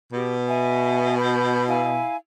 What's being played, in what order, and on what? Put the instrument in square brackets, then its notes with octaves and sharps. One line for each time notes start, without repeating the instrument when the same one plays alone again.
[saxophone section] B2 [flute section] G4
[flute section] E5 G#5
B5 G6
E4 F5 G#5